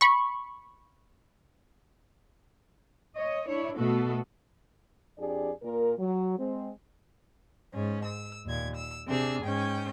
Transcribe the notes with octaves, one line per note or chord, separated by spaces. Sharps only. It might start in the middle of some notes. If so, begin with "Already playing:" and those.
B5 C#6
C#5 D#5
D4 E4 C#5
B2 A3 B3 F#4 A4
F2 D4 G4 G#4 D5
A#2 A#4
F#3
G#3 C4
G#2 C#4
E6
D#2 A#2 G#6
E6
C3 D4 G#4 E6
G#2 C#4 G5